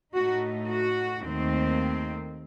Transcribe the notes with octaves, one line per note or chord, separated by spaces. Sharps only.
A2 A3 D#4 F#4
F#4
D#2 D#3 A3 C4